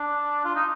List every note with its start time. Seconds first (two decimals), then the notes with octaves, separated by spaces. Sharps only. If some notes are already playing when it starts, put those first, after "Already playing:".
Already playing: D4
0.45 F4
0.55 D#4